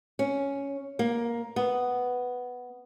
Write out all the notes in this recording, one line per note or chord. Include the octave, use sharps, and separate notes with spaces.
C#4
A#3
B3